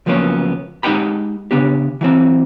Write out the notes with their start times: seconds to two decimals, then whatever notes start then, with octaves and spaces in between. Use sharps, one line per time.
0.06 C#2 F3 F#3 A#3 B3 C#4
0.83 G#3 D#4 G4 F#5 G5 B5
1.51 C#3 B3 D4 G4
2.01 E3 F#3 C4